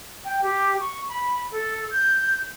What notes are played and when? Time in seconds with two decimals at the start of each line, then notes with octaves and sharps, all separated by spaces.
0.25 G5
0.42 G4
0.79 C#6
1.08 B5
1.51 A4
1.91 G6